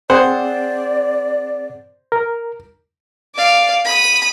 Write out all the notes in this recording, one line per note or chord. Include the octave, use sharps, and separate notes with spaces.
C4 G#4 C5 D5 F#5
A#4
D5 F5
B5 D#6